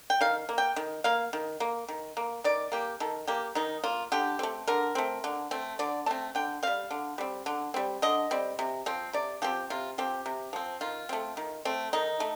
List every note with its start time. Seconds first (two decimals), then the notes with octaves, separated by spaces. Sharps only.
0.10 G5
0.21 D#3 F5
0.49 A#3
0.58 G5
0.76 D#3
1.04 A#3 F5
1.33 D#3
1.60 A#3
1.88 D#3
2.17 A#3
2.44 D#3 D5
2.72 A#3 G4
3.00 D#3 A4
3.28 A#3 G4
3.55 D#3 D#4
3.84 A#3 F4
4.12 D3 G4
4.39 A3 C4
4.67 D3 A#4
4.95 A3 C4
5.24 D3
5.51 A3 C4
5.79 D3 D5
6.06 A3 C4 A5
6.35 D3 G5
6.63 G3 C4 F5
6.91 D3
7.18 G3 C4
7.46 D3
7.74 G3 C4
8.02 D3 D#5
8.31 G3 C4
8.59 C3
8.86 F3 C4
9.13 C3 D5
9.42 F3 C4 G4
9.70 C3 F4
9.98 F3 C4 G4
10.26 C3
10.53 F3 C4
10.81 D#3 F4
11.09 A3 C4
11.37 D#3
11.65 A3 C4
11.93 D#3 D#4
12.20 A3